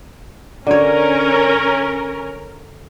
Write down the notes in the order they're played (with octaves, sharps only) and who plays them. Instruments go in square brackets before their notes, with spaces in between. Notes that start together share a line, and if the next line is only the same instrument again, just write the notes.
[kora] D3 C#5 [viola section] C#4 A#4